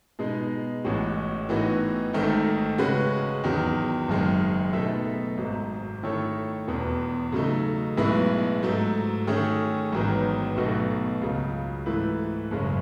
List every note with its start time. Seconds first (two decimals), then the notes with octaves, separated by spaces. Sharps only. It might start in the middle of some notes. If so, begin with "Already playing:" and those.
0.19 B2 G#3 D#4
0.84 A1 A2 G#3 C#4 F#4
1.49 A2 E3 B3 D#4 F#4
2.13 G#1 G#2 D#3 A3 D#4
2.78 C#3 G#3 C#4 F#4 B4
3.44 E2 D#3 F#3
4.08 F#1 F#2 D#3 G#3
4.73 B2 A3 D#4 A4 E5
5.38 G#1 G#2 F#3
6.03 D#3 A3 E4 A4 C#5
6.68 E1 E2 B2
7.32 C#3 F#3 A3 D#4
7.97 B1 A2 G#3 B3 E4
8.63 G#2 F#3 A3
9.27 D#3 A3 C#4 G#4
9.92 A1 G#2 D#3 F#3 B3
10.57 B1 B2 A3 D#4 F#4
11.21 C#2 C#3 F#3
11.86 G#2 E3 A3 E4 B4
12.51 F#1 F#2 C#3 G#3 C#4